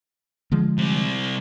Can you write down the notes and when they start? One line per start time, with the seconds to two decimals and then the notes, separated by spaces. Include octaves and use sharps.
0.52 D3 F3 G#3
0.78 C3 G3